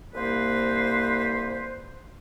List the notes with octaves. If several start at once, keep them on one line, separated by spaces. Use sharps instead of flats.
C2 A#3 B4 C5